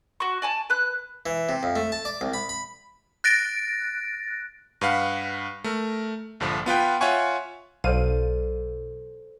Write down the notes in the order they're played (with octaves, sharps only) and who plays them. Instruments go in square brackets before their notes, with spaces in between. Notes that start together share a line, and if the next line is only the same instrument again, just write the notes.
[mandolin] F#4 C#6
D5 G#5 A5
B4 F#6
[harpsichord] E3
C3
F2
A3
A5
D5
C2
B5
B5
[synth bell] F#6 A6 A#6 D7
[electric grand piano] G2 B4 F5 F#5
A3 A#4
A#1 G2 D3 F3
B3 F4 B4 G5
F4 C#5 E5 F#5 G#5 C#6
[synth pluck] B1 F5 D#7 [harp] A4 C5 D5